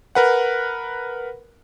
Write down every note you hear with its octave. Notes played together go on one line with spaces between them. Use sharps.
A#4 B4 F#5